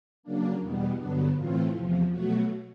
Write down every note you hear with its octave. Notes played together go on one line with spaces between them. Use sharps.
C#3 F#3 A#3 D4
E2 B2 G3 B3
G2 D3 F#3 B3 D4
A2 E3 A3 C4 F4
E2 C3 F3
B2 F#3 A3 F#4